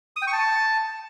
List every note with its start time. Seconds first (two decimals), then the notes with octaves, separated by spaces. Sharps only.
0.16 D#6
0.22 G5
0.27 C#6
0.33 A5